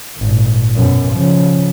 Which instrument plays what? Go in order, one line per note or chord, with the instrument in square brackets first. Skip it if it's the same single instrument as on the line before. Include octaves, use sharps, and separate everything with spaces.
[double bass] G#1 A#2
F#2 B2
C#3 F3